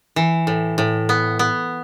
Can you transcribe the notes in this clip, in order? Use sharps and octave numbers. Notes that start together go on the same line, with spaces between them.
E3
A2
A2
B3
B3